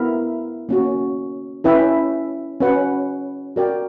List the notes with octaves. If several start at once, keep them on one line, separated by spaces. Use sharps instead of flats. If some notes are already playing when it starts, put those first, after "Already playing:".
Already playing: B3 E4 A#4 E5
A#3 C#4 F#4
C#4 E4 B4 E5 G5
C#4 F#4 B4 F#5
F#4 A#4 D5 G5